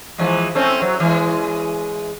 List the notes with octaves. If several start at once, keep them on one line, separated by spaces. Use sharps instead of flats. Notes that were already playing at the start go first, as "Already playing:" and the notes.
E3 F3 G#3
A3 C4 C#4
F#3
E3 G#3